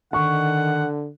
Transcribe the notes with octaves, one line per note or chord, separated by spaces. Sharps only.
D3 D#3 F#5 C#6